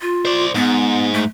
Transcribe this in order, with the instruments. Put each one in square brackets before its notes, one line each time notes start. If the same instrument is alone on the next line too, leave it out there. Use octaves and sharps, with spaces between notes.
[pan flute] F4
[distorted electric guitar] C5 D5
[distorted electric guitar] G#2 [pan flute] B3
[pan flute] A3